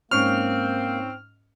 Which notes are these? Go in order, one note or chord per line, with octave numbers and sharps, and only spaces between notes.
G#2 A#3 C4 C#4 C#6 F6